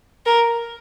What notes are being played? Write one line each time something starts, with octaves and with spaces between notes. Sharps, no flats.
A#4